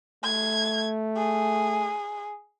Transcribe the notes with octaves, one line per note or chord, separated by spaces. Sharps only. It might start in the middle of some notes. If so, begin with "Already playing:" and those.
A3 G#6
G#4